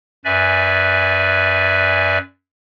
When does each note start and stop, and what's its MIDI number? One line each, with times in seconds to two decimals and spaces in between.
0.25 2.18 42
0.25 2.18 71
0.25 2.18 74
0.25 2.18 76
0.25 2.18 80